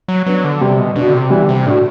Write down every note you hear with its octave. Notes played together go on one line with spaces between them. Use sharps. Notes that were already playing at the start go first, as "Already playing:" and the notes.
F#3
F#3 B3 D4
D3
C3 G3
B2
B2 D4
F#4
D3
C3
E3 G3
D3
C3
A2 D4 F#4